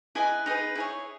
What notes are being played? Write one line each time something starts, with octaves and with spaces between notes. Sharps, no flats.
E4 G#4 B4 D#5 G#5
D#4 G#4 B4
E4 G#4 C#5